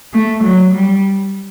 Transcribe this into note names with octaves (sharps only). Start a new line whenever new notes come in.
A3
F#3
G3